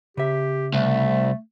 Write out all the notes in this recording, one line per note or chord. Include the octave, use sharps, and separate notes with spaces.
C#3 G4 E5
C2 A3